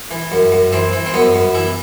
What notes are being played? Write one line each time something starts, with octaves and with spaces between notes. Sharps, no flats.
E3
F#2
F#2
E3 C4
E3
C4
F#2 B3
F#2
E3 E4